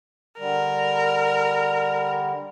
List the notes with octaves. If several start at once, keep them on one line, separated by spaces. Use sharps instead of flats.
D3 G3 A#4